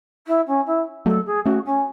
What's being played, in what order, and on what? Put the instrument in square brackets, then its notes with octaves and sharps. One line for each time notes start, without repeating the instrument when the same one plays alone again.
[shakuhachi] E4
C#4
E4
[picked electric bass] F#3 A3 [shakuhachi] A4
[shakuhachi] G#4
[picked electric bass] A3 C#4 [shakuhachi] F#4
[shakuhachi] C#4